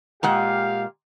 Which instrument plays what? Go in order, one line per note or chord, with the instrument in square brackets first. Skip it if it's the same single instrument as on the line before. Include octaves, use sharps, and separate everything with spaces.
[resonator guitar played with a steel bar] A#2 G#3 F#5 [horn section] G4 F5